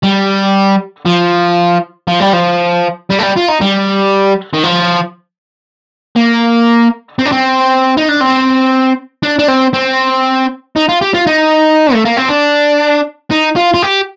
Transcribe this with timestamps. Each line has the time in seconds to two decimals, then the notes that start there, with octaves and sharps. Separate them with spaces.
0.04 G3
1.05 F3
2.08 F3
2.20 G3
2.33 F3
3.10 G3
3.19 A3
3.23 G3
3.36 F4
3.48 D#4
3.61 G3
4.53 D#3
4.63 F3
6.16 A#3
7.19 C4
7.26 D4
7.32 C4
7.97 D#4
8.09 D4
8.21 C4
9.23 D4
9.39 D4
9.48 C4
9.73 C4
10.76 D#4
10.89 F4
11.01 G4
11.14 F4
11.27 D#4
11.94 A3
12.05 A#3
12.17 C4
12.29 D4
13.31 D#4
13.56 F4
13.74 F4
13.82 G4